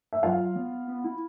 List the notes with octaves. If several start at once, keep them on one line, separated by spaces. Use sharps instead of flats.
E5
F#3 F4 F5
B3
B3
E4